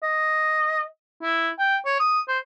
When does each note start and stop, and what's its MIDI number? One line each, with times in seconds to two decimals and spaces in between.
0.03 0.83 75
1.23 1.50 64
1.59 1.76 79
1.86 1.97 73
2.00 2.20 87
2.28 2.38 72